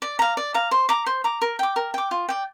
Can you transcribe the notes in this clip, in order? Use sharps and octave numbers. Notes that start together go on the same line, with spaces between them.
D5
F5 A#5
D5
F5 A#5
C5
A#5 D6
C5
A#5 D6
A#4
G5 D6
A#4
G5 D6
F4
D5 G5